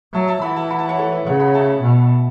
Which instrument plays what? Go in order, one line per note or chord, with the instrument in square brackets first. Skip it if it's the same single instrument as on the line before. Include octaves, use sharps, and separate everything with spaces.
[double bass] F#3 [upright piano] E5 A5
[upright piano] E5 A5
[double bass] E3 [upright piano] F#5 B5
[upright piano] E5 A5
F#5 B5
E5 A5
C#5 F#5
A4 C#5
B4 E5
[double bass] C#3 [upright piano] C#5 F#5
[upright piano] F#5 B5
E5 A5
[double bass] B2